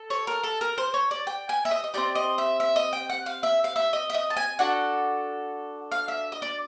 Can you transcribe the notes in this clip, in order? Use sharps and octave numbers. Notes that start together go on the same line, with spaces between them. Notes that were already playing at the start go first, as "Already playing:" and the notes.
Already playing: A4
C#5
A#4
A4
A#4
C5
C#5
D5
G5
G#5
E5
D#5
D#5
C4 D#4 G4 D5
D#5
E5
E5
D#5
G5
F#5
F5
E5
F5
E5
D#5
E5
D#5
A5
G#5
D4 F#4 A4 F#5
F5
E5
D#5
D5